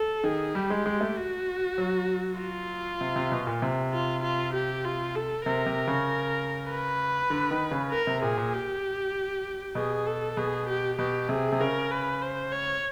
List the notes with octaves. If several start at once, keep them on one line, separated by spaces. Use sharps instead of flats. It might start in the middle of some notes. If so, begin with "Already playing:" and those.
Already playing: A4
D#3 G#4
G3 G4
G#3
G#3
A3
F#4
F#3
F4
C3
C3
B2
A#2
C3
F4
F4
G4
F4
A4
C3 A#4
C3
C#3
B4
D3
D#3
C#3
A#4
C3
A#2 G#4
A#2
G4
B2 G#4
A4
B2 G#4
G4
B2 G4
C3 G#4
C3
C#3 A#4
B4
C5
C#5